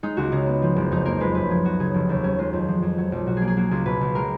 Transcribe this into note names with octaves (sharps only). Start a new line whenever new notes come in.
G#3 D#4
C#2 F#4
C#3 D#4
B3
F3
F#1
F2 D#4
A#3 A#4
G#3 B4
F#2 B4
F3 G#4
B3 F#4
C#3 G#4
F1
D#2
F#3 C#4
G#3 F4
F2
F3
F2
F#3
B1
B2 F#4
A#3 G#4
G#4
A#3 F#4
C#2 G#4
B2 B4
C#2
G#3 A#4